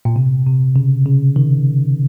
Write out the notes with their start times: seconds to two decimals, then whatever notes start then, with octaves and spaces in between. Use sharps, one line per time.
0.05 A#2
0.16 C3
0.46 C3
0.76 C#3
1.06 C#3
1.36 D#3